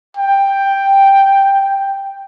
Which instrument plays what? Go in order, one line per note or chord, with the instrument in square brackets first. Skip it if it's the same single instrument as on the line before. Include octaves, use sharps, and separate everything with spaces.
[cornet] G5